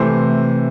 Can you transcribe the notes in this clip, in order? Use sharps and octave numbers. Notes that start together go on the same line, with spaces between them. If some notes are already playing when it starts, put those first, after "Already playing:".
Already playing: C3 E3 A3 C5